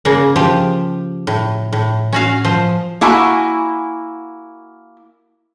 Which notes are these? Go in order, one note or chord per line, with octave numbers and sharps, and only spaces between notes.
C#3 A#3
F3 G4
A2
A2
C#4 F#4 F5
F3 C5
A#3 E4 F#4 G#5